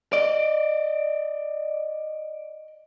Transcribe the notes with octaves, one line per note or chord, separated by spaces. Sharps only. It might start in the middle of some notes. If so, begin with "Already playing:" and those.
D5 D#5